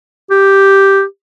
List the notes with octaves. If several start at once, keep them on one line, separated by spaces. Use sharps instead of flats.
G4